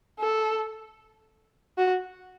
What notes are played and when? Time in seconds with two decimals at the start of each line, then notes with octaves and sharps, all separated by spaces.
0.19 A4
1.78 F#4